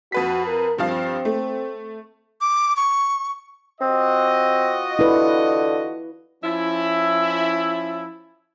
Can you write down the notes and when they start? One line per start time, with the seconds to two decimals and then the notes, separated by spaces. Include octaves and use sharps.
0.12 F2 F#4 B4 B6
0.47 A#4
0.78 G2 F3 C4 F5
1.25 A3
2.41 D6
2.77 C#6
3.81 C4 F4 F#4 D#5
4.99 D3 E4 B4
6.44 F3 C#4 E4